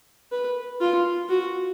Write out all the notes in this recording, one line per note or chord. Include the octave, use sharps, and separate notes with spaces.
B4
F4
F#4